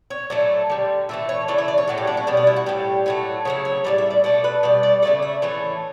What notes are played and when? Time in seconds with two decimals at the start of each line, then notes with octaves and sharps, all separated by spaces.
0.10 C#5
0.30 A2 F#3 A3 D5
0.70 D3 G3
1.09 A2 E3 A3 E5
1.29 C#5
1.48 C#3 E3 A3 D5
1.58 E5
1.68 D5
1.78 C#5
1.88 A2 F#3 A3
1.98 G4
2.07 D4
2.17 C#4
2.27 B2 G3 D4
2.37 D4
2.47 E4
2.56 F#4
2.66 A2 G3 G4
3.06 A2 F#3 A3
3.45 C#3 F#3 A3 C#5
3.65 C#5
3.84 A2 E3 G3 D5
3.98 E5
4.11 D5
4.24 B2 A3 D5
4.44 B4
4.63 B2 G3 D5
4.83 D5
5.02 C#3 E3 A3 D5
5.22 E5
5.42 A2 E3 A3 C#5